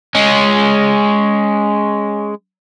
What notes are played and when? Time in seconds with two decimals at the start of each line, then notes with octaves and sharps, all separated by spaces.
0.15 G#3 C#4